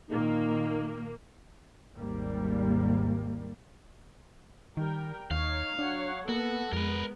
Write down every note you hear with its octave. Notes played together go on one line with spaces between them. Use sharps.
A#2 D#3 A#3 D#4
G#1 D#2 G#2 G3 A#3
D#3 G3 A#4 G5
D#2 D#4 C#5 F5
F#3 D4 C#5 F#5
A#3 B3 F#4 A4
F2 G#3 B3 A#4 B4